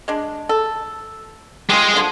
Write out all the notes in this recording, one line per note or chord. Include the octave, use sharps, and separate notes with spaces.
G#3 D4
A4
G#3 F4 G4 G#4
D3 F3